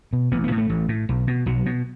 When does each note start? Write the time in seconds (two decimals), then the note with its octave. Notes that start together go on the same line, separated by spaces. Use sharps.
0.13 B2
0.32 A1 B3
0.44 B3
0.51 A2
0.58 A3
0.70 A1
0.89 A2
1.09 B1
1.27 B2
1.46 B1 F#3
1.66 B2